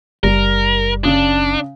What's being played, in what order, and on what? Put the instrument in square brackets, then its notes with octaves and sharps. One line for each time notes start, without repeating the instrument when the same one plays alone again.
[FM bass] F#1 [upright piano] G3 [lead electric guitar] A#4
[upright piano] C#3 D#6 [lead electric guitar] D4